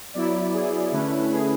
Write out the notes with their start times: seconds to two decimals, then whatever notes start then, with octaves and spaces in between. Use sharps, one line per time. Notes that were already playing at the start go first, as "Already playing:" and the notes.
0.14 F#3 B3 E4 D5
0.53 G#4
0.92 D3 A3 C#4 E4 B4
1.32 G#4